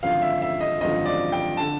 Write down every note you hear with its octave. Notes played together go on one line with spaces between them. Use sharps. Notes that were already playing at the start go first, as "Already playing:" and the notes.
G#1 F#2 D3 F3 F5
E5
E5
D#5
G#1 F#2 D3 F3 D#5
D5
G5
D3 A5